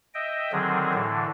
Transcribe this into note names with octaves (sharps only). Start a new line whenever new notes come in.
D#5 E5 G5
D3 D#3 F#3 C4 G#4
A2 D3 E3